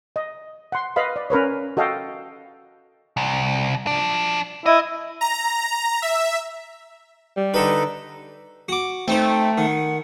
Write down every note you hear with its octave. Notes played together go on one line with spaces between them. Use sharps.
D#5
F#5 C6
B4 D#5 F5 B5
D5
C#4 A#4 B4 C#5
F#4 A4 D#5 F5 G5
C2
F3 D4
E4 D#5
A#5
E5
G3
D3 D#4 A4 B4
F#4 D6
A3 C4 D#4 C5 G5
D#3 F#5